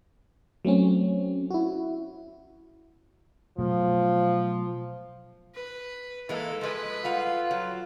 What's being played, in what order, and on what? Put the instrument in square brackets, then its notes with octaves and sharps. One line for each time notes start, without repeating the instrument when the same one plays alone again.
[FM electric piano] F#3 A3 C4 C#4
E4 F#4
[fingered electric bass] B2 F#3 A3 [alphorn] F3
[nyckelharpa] B4
[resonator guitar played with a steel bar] E3 G#3 A#3 [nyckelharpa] A4
[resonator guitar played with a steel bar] F3 G#3 D#5 [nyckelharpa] A4 B4
[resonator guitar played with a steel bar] G3 F5 F#5 [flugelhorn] F4
[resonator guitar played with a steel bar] F#3